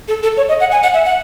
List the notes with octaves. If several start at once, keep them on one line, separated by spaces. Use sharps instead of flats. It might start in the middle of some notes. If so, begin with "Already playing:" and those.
A4
A4
C#5
D#5
F#5
G#5
F#5
E5
F#5